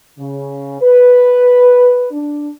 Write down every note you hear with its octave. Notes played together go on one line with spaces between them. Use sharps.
C#3
B4
D4